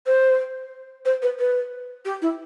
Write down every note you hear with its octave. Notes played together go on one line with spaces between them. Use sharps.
C5
C5
B4
B4
G4
E4